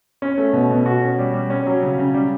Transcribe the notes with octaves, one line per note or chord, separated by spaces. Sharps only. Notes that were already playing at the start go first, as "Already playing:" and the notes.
C#4
A3
B2
B2
F#4
C#4
G3
G3
C#4
F#3
C#3
C#3
G3